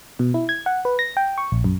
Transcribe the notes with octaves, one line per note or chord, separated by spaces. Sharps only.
B2
E4
G#6
F#5
B4
A#6
G5
C#6
A#1
F#2